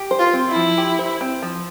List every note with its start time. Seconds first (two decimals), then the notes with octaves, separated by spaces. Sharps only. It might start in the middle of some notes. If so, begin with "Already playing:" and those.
Already playing: G4
0.11 C5
0.19 F4
0.33 C4
0.48 E4
0.56 F3
0.78 G4
0.99 C5
1.21 C4
1.42 F3